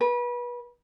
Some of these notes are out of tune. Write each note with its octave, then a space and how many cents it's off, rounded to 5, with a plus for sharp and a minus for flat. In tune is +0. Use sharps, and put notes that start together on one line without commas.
B4 -30